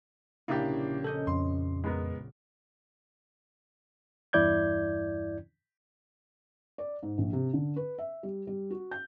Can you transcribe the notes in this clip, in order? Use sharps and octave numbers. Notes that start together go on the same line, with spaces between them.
A#1 C#3 A#3 D4 E4 G4
A#3 C#4 A4 D#5 G6
F2 C6
G#3 B3 A#4
E2 G2 E4 D5 G6 G#6
D5
G#2
A#1
C3
D3
B4
E5
G3
G3
F#4
G6